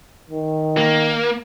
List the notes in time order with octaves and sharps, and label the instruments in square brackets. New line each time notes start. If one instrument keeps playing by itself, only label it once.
[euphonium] D#3
[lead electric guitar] A#3